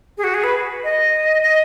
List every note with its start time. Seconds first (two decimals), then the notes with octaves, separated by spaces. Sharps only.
0.18 G#4
0.24 F#4
0.34 G#4
0.44 B4
0.84 D#5
1.43 D#5